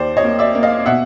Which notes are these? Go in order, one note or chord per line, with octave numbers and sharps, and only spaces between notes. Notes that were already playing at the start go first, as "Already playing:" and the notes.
Already playing: D#2 C5 D5
C#5 D#5
A#3
D5 E5
A#3
D#5 F5
B2 E5 F#5